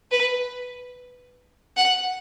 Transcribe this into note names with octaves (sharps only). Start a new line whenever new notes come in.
B4
F#5